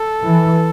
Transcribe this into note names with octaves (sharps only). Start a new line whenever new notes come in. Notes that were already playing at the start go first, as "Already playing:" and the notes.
Already playing: A4
E3